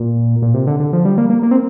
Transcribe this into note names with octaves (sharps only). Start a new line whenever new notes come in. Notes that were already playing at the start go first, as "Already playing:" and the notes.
Already playing: A#2
A#2
C3
D3
D3
F3
G3
A#3
A#3
A#3
C4